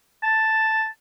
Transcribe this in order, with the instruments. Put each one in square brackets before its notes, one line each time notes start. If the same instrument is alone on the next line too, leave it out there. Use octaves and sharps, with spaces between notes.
[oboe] A5